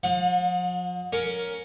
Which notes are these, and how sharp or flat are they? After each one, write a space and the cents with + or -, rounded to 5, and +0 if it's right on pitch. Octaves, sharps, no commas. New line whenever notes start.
F3 +35 F#5 -40
C#4 +5 A#4 +5